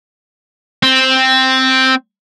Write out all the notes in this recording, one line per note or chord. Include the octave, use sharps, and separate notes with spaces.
C4